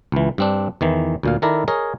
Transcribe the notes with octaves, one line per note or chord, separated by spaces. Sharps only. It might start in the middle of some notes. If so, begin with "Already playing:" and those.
C#2 E3
G2 C4 D4
E2 D#3 E3
D2 A#2 F5
D#3 E4 A4 A#4 D5 A#5
G#4 A#4 C#5 D#5